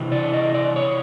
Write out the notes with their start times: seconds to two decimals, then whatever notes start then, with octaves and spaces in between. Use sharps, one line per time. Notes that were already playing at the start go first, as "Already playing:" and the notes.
Already playing: C3 E3
0.12 D5
0.33 D#5
0.54 D5
0.76 C#5